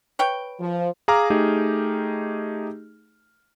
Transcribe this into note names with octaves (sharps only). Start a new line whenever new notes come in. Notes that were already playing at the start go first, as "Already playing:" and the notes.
B4 C#5 G5
F3
G#4 F5 A#5 D6 F6
A3 D#4 G4 G#4